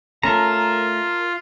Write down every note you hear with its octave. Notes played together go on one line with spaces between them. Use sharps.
A3 C#4 F4 A#4 A5 A#5